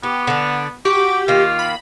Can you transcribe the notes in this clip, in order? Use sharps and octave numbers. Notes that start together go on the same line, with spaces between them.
B3 G4
D3 D4
F#4 G4 D6
D#3 A#3 F4
B5